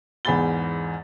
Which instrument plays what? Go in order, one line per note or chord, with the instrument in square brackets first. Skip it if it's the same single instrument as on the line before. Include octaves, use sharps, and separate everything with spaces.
[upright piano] E2 G#2 G#4 B5 A6 G7